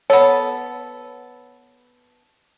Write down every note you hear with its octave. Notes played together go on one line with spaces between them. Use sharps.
B3 A4 C#5